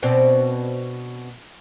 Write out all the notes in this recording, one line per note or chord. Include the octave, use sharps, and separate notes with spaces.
B2 C4 D4